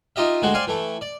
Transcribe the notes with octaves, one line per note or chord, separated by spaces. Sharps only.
D#4 F4 G4 D#5 E5
D2 G#3 F#4 C5 G5
C5 D5 F5 G5 G#5 C6
E3 A3 G5
D5